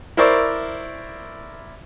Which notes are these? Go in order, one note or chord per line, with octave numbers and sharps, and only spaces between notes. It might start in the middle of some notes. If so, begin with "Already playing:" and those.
E4 A#4 C5 D5 C#6 E6